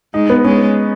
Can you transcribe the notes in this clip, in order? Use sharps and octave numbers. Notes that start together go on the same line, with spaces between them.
G#3 D#4
B3
G#3 C#4